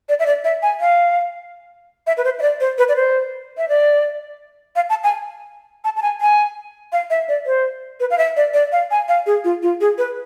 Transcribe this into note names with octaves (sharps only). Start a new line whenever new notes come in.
D5
E5
D5
E5
G#5
F5
E5
B4
C5
E5
D5
C5
B4
D5
C5
E5
D5
F5
A5
G#5
A5
A5
G#5
G#5
F5
E5
D5
C5
B4
F5
E5
D5
D5
F5
G#5
F5
G#4
F4
F4
G#4
B4